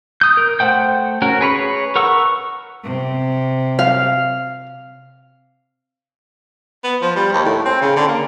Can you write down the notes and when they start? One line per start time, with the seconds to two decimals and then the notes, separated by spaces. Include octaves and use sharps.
0.21 D#6 G6
0.37 A#4
0.59 A3 C5 F#5 G5 G6
1.22 C#4 F#4 A#4
1.41 G#4 B4 C#5 B5
1.96 A#4 B4 F#5 C#6 E6
2.83 C3
3.79 F5
6.84 B3
7.02 F3
7.16 G3
7.33 D#2
7.45 A2
7.65 C4
7.81 C#3
7.96 D3
8.07 A#3